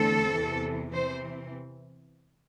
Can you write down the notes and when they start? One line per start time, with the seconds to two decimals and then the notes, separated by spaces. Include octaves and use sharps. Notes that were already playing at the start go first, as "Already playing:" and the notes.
Already playing: E2 D3 A3 C4 A4
0.34 E2 C3 E3
0.92 C3 E3 C4 C5